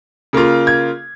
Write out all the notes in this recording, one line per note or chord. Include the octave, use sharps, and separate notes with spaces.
C#3 A#3 F4
G#6